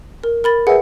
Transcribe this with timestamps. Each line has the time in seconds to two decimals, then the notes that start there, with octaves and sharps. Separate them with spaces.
0.24 A#4
0.44 A#4 B5 A6
0.67 G#4 B4 E5 F#5